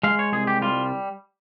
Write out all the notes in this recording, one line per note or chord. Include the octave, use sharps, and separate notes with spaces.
G#3 F5
C#5
C2 G#4
G4
G3 F4